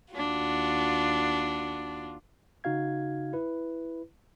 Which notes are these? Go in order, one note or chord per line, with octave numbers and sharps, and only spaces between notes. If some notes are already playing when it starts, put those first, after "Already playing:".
D#2 D4 F4 F#4
C#3 D#4 F#4 F5 G#6
E4 B4